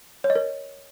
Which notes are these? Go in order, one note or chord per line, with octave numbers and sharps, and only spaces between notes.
C#5
D#5
A#4